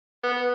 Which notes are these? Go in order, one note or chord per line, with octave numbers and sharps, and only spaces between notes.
B3